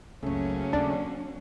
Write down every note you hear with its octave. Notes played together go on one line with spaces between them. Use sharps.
F#1 C#2 C#3 F#3 A3 A#3 C#4
D#2 C4 D4